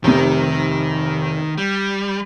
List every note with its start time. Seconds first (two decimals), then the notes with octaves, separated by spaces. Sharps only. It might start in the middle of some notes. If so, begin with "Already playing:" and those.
0.04 F1 C3 D#3 A#4
1.58 G3